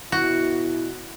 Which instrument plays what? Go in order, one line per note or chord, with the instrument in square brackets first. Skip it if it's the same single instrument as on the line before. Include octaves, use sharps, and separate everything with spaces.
[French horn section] B2 E4 [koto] F#4